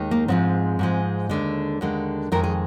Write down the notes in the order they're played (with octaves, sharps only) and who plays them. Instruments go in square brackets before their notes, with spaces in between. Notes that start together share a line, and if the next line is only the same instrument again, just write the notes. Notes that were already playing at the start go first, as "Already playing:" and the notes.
Already playing: [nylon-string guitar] D#2 D#3 G#3
A#3
G#2 F3 G#3 C4
G#2 F3 G#3
D#2 D3 G#3
D#2 D3 G#3
F2 D#3 G#3 A#4
G#4